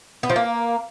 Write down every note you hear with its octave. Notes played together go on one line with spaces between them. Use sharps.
B3
F3
A#3